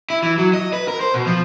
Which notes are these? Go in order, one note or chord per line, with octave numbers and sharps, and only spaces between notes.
E4
E3
F#3
D#5
B4
A#4
C5
B2
F3